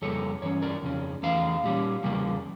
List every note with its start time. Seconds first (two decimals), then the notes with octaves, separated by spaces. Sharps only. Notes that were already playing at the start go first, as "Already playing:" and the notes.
0.02 F2 C#3 G3 A#3 A4 C#5
0.42 G2 E3 C#4 C#5
0.62 A#4 D5
0.82 F2 C#3 C#4
1.23 E2 E3 A3 F5
1.64 A#2 G3 C#4
2.03 E2 C#3 G3 A#3